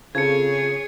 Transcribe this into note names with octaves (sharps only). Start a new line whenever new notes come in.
C#3 C4 F4 G#4 A4 C#5 G#6 C#7